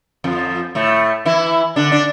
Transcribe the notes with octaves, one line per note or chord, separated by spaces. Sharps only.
F2 F3
A2 A3
E3 E4
D3 D4
D4